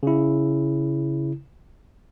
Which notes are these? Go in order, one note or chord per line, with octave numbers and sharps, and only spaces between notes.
C#3 E4